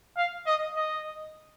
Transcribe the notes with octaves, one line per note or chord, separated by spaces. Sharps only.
F5
D#5
D#5